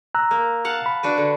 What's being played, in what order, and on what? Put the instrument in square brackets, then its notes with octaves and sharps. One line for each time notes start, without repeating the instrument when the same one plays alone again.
[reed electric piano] A#5 E6 F#6
[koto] A#3
F5 F#5 A5
[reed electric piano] B5
[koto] D4 F#4 B4
D3